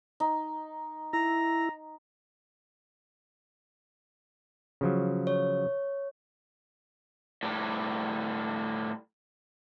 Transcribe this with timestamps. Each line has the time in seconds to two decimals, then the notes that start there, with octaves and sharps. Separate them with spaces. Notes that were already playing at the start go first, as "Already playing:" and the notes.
0.20 D#4
1.13 E4 A#5
4.81 C#3 F3 F#3
5.27 C#5
7.43 A2 G3